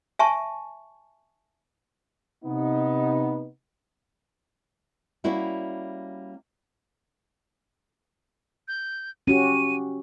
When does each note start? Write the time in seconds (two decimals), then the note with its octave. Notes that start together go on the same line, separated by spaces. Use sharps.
0.19 E5 G#5 A5 C#6
2.44 C3 B3 D#4
5.24 G3 A#3 C#4 E4 F#4
8.68 G6
9.27 C#4 F#4 G4 D#7